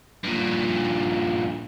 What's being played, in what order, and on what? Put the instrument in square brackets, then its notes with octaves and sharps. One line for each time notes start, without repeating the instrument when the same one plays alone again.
[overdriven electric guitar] G2 A#2